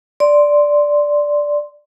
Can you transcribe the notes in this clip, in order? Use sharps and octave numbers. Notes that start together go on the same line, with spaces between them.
D5 C6